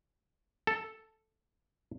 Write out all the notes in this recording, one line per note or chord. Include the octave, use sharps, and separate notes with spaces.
A4